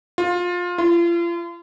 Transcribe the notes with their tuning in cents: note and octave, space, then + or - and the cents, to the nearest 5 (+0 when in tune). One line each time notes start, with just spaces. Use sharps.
F4 +20
F4 -40